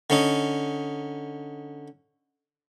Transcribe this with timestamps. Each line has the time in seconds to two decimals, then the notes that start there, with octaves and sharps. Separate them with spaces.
0.10 D3 C#4 D#4